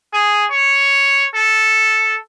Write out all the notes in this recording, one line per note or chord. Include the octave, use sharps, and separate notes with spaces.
G#4
C#5
A4